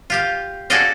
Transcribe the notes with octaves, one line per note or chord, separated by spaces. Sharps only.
F4 G4 F5
F#4 G#4 A4 D5 D#5 F5